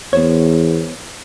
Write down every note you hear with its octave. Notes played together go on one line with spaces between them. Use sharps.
E2 B3 C5 C#5